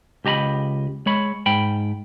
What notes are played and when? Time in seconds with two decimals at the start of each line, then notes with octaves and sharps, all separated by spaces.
0.25 C#2 G4 D#5 A#5 B5
1.06 G#3 C#5 B5
1.46 G#2 G5 B5